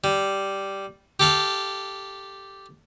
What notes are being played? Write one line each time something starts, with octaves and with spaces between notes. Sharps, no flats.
G3
G4 A4 F5